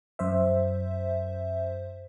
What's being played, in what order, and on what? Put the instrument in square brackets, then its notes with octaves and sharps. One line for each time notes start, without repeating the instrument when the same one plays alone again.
[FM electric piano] F#2 C5 E5